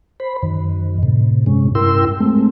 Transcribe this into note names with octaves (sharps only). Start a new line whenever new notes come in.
C5 B5
F#2 D#3
A2 C3
G2 C3 G#3 C#4
G2 E4 A#4 G5 C6 E6
G#3 A3 C4